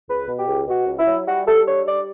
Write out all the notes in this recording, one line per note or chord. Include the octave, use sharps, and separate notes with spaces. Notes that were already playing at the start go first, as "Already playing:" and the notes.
C#2 B4
B2
G4
C#2
B2 F#4
C#2
E4
F#3
G3 F#4
G3 A4
D4 C#5
G3 D5